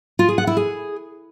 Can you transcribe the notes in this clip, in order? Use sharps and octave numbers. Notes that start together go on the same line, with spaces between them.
F4
G#4
F#5
E4
G#4